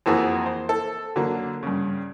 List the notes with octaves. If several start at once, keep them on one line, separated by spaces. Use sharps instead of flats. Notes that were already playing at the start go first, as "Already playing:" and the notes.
F2 E3 A#3 F#4 G#4 A5
C5
A4
D3 F#3 A#3
G2 C#3